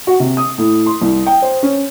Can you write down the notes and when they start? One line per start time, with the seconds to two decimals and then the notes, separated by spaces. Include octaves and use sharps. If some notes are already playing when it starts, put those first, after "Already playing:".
0.07 F#4
0.20 C3
0.37 D#6
0.58 A2
0.86 C6
1.01 C2
1.27 G5
1.42 C5
1.63 C#4